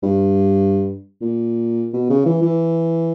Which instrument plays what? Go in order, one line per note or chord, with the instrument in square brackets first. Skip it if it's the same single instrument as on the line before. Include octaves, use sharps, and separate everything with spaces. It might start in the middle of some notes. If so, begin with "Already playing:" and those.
[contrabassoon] G2
A#2
B2
C#3
E3
E3